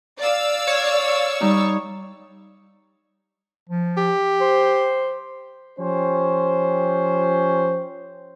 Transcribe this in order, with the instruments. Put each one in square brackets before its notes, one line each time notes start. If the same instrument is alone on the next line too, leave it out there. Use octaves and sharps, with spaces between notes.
[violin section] D5 F5 E6
[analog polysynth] C#5
[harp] G3 D#4
[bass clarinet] F3
[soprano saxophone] G4
[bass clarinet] C5
[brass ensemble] F3 C#4 G4 C5